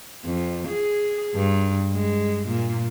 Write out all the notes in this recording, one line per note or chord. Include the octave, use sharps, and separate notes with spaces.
F2
G#4
G2
G#3
A#2